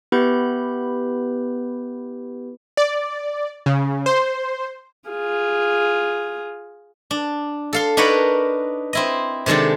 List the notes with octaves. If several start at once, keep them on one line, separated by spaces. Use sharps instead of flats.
B3 E4 G4 B4 B5 G6
D5
C#3
C5
F4 G#4
D4
A4 F5 C6
D4 D#4 A#4 B4 C#5 F#5
C4 E4 D#5
C3 D#3 G#3 D4 A4